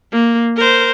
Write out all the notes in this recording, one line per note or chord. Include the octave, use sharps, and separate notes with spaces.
A#3
A#4 C5